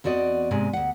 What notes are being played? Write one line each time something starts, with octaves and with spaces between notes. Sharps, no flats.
E2 C4 F#4 D5 D#5
G#2 C3 G#3 G#5
D2 F#5